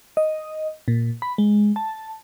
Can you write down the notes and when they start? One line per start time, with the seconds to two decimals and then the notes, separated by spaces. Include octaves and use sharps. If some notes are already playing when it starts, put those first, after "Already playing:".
0.17 D#5
0.88 A#2
1.22 B5
1.38 G#3
1.76 A5